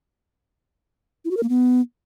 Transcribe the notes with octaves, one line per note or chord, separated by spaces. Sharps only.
E4
F#4
A#4
A#3
B3